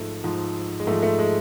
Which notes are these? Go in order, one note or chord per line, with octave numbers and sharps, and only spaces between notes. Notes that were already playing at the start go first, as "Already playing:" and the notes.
Already playing: G#2 F3 A3
G#2 F3
G#3
G#2 F3 A3
A3
G#3